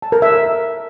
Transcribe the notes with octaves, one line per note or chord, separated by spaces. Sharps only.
A5
A#4
E5
A#4